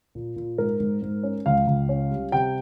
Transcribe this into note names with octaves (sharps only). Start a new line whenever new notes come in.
A#2
A#2
G#2 A#4
G#2
G#2
C#4
C#2 F5
C#2
C#4
G3
C3 G5